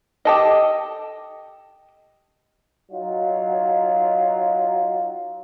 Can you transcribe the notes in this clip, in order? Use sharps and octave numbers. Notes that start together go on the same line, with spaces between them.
G4 A4 D#5
F#3 D#4 F4